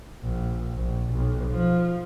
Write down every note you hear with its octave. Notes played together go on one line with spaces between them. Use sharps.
A#1
A#1
B1
F3